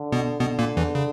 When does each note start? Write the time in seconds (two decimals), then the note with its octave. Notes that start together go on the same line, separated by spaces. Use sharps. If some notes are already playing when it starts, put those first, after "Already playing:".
Already playing: D3
0.12 B2 B3
0.40 B2 D3 B3
0.59 A#2 A#3
0.77 E2 E3
0.95 C#3